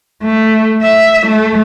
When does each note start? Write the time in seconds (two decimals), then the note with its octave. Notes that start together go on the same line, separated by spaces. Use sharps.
0.23 A3
0.82 E5
1.27 A3